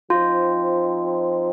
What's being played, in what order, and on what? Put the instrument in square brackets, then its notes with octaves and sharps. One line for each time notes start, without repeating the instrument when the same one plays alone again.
[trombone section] F3 C4 D#4 [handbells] F4